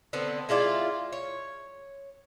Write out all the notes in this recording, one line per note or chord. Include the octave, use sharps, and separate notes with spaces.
D3 B3 C4
G#3 E4 F4 D5
C#5